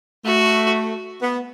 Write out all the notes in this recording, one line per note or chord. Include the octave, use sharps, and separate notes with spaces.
A3 F#4
B3